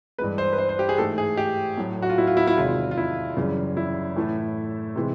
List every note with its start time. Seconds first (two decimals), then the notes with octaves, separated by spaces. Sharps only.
0.18 G2 E3 G#3 B4
0.38 C5
0.53 B4
0.58 C5
0.69 C5
0.79 G4
0.89 G#4
0.98 G#2 E3 A3 A4
1.18 G#4
1.37 G4
1.77 A2 F#3 A3
2.02 F#4
2.10 F4
2.18 E4
2.27 F4
2.37 E4
2.47 E4
2.57 E2 C3 D#3 G#3 F4
2.91 F4
2.98 E4
3.37 F#2 C#3 E3 G3
3.77 E4
4.16 A2 E3 A3
4.95 C3 E3 G#3